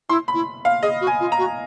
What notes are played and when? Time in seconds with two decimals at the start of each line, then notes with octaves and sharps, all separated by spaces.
0.09 E4 C6
0.28 B5
0.34 E4
0.65 F5
0.82 G#4 D#5
1.01 F#4
1.07 G#5
1.20 F4
1.32 A#5
1.38 F#4